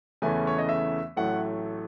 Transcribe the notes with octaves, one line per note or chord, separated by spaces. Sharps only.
E2 C#3 E3 A3 C#4 G#5
C#5
D#5
E5
A1 A2 F#3 A3 F#5